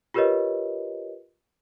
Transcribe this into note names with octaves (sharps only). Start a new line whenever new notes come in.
F4 G4 A#4 B4 C#5 D#5